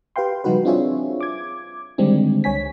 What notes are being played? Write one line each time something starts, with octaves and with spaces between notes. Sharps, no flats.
G4 B4 F5 G5 C6
C#3 F3 G3 D#4 F#4 B4
C4 D4 F4 G#4 C#5 E5
D6 G#6
D3 D#3 G3 G#3 C4 D4
C#2 C#5 G#5 B6